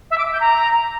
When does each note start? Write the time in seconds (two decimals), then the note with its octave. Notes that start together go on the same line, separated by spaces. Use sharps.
0.10 E5
0.18 D6
0.25 E5
0.32 G6
0.40 A#5